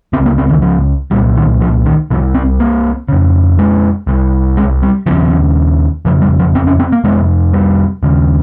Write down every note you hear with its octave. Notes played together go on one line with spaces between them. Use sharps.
C#2 C#3 C4
A#3
C4
D#3
F3
C2 A#2 G3
D#3
F3
D#3
C2 C3 F3
C4
A#3
F2 C#3
G#3
C2 C3
G#3
G3
D#2 C#3 F3
F2 C#3 F3
G3
F3
C4
C#4
C4
A#3
F2 C3 G#3
G3
D#2 C#3